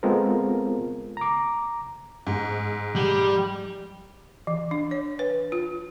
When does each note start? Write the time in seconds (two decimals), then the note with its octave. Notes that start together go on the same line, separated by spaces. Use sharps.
0.03 G#3 B3 C4 F4 A4 A#4
1.17 A#5 D6
2.27 G#2
2.96 G3
4.47 E3
4.71 D4
4.91 C#5
5.19 B4
5.52 F4